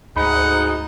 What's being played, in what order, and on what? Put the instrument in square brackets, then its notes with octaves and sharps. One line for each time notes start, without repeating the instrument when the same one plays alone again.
[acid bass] D2 [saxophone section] G#2 D#4 [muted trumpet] F#5 [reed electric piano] B5